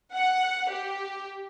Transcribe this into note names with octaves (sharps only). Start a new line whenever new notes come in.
F#5
G4